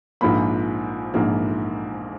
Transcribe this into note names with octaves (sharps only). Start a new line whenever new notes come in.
A#1 G#2 F3 A#3 B5
A#1 G#2 F3 A#3